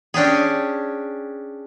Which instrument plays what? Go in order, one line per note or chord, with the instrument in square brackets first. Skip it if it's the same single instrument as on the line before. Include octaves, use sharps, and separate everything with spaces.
[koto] C#4 D4 G4 G#4